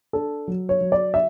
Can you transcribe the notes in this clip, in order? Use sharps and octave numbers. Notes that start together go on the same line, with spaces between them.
D4 A4
F#3
C#5
F#3
D5
E5